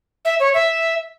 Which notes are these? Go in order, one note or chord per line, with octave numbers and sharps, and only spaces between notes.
E5
C#5
E5